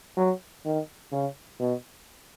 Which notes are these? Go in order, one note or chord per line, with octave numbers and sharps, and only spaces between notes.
F#3
D#3
C#3
B2